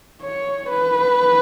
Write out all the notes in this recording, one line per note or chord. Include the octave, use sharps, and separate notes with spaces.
C#5
B4